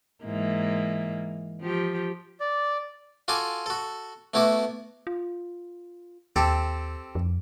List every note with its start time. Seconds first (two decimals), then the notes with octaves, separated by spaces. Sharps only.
0.25 G#2 E3 A#3
1.61 F3 G4
2.40 D5
3.28 F4 F#4 A4 G#5 D6
3.66 F#4 A4
4.34 A3 B3 E4 F#4 D6
5.07 F4
6.36 D#2 C4 G4 A4
7.15 F2